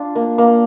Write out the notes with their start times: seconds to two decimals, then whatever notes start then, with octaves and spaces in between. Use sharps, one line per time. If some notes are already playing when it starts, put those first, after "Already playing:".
Already playing: D4 F4
0.15 A#3
0.38 A#3